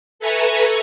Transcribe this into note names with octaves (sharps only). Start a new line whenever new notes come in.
A4 B4 E5 G#5 A#5 C#6